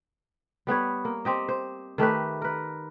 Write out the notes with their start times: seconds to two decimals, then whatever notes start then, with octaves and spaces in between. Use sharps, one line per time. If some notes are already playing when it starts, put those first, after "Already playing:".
0.67 G3 B3 B4 C#5
1.05 A#3
1.25 C4 G4 D#5
1.49 C5
1.98 D#3 A3 G4 B4
2.42 A#4 B4